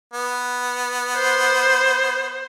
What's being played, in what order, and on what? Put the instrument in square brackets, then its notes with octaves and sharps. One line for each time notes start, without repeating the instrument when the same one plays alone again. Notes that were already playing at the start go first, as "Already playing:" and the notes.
[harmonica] B3
[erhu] C5